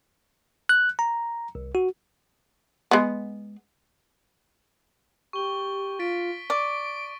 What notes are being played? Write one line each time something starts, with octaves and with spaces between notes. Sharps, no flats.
F#6
A#5
C2
F#4
G#3 B3
G4 C#6 G7
F4 A6 B6 D7
D5 C#6 D7